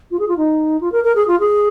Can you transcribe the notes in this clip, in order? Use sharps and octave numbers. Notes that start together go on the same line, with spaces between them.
F4
G#4
F4
D#4
F4
A#4
A#4
G#4
F4
G#4